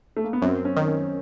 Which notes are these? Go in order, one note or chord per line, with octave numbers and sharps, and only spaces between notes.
A3
A#3
B3
F#2 C4
C#4
D#3
C#4